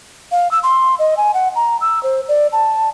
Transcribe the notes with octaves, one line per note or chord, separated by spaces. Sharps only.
F5
E6
C6
D#5
G#5
F#5
A#5
E6
C5
D5
A5